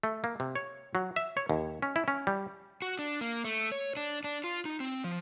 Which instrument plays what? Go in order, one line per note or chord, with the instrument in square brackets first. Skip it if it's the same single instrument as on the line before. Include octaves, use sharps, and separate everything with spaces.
[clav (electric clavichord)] A3
A#3
C3
C#5
F#3
E5
C#5
D#2
C#4
E4
C#4
G3
[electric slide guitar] F#4
D4
A#3
A3
C#5
D4
D4
F4
D#4
C4
F3